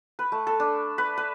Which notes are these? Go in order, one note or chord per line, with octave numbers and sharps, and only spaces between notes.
B4
A3
A4
D4
B4
B4